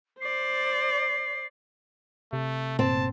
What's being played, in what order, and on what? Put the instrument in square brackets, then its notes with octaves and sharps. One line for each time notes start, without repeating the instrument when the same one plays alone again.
[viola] C5 D5 [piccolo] C7
[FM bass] C3 [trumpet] A3
[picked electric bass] G1 A#2 [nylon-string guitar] C4 [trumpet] A5